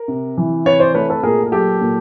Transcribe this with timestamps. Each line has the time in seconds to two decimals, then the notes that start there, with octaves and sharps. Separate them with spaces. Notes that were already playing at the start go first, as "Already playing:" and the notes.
Already playing: A#4
0.08 C3
0.37 E3
0.65 C3 B4 C#5
0.80 C5 D5
0.94 A3 B4 C#5
1.10 A4 B4
1.23 A#2 G#4 A#4
1.43 G#4
1.52 F#3 G4 A4
1.81 A#2